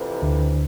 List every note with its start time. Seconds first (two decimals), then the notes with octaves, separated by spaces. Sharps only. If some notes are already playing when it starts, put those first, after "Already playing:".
Already playing: F2 C3 E3
0.22 D2 D3